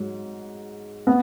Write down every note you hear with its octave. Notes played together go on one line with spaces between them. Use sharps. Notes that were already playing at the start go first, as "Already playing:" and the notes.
Already playing: G#2 F#3
B3